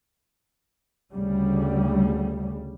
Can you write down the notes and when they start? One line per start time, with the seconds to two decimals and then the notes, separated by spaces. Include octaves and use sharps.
1.14 D2 C#3 G3